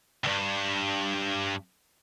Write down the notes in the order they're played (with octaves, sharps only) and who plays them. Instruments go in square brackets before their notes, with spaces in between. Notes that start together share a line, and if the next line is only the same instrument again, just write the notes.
[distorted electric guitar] C#2 G2